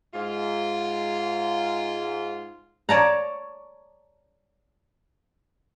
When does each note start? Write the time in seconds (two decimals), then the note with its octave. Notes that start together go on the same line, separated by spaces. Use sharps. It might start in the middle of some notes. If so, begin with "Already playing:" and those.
0.14 G#2 F4
2.89 C#5 D5 A5 A#5